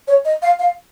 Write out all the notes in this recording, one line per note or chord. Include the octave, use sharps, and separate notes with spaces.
C#5
D#5
F5
F5